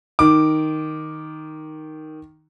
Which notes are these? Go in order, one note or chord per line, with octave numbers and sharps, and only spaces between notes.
D#3 D6